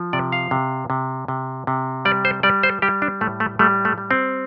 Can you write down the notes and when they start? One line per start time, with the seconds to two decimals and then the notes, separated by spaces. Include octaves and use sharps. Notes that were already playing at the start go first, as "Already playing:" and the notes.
Already playing: F3
0.13 C3 D5
0.32 F5
0.51 C3
0.90 C3
1.28 C3
1.67 C3
2.05 G3 D5
2.25 C5
2.43 G3 D5
2.63 C5
2.82 G3 G4
3.02 D4
3.21 A2 A3
3.40 A3
3.59 G3 A3
3.85 A3
3.98 G3
4.11 C4